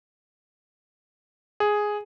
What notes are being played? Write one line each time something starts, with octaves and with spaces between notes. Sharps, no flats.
G#4